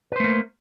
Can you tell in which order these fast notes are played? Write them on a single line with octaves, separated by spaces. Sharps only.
B4 C5 A3 A#3